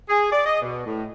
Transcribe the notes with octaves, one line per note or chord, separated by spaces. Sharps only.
G#4
D5
D#5
B2
A2